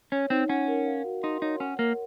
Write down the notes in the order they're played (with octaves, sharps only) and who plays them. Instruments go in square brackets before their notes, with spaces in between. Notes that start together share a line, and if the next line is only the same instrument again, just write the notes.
[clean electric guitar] C#4 [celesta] C#5
[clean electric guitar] C4 [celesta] D#4
[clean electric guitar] C#4 [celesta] F#5
[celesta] A#4
F5
F#4
[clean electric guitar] D#4 [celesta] C6
[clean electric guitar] D#4 [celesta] C#5
[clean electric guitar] C#4 [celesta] F#5
[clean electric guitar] A#3 [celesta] A#4